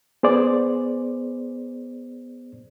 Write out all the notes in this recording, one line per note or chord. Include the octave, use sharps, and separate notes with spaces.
B3 G#4 C5 D5